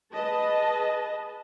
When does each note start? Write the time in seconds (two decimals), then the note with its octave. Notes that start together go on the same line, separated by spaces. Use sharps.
0.12 G#4 B4 D#5 A5